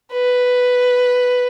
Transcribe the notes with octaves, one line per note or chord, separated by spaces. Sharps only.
B4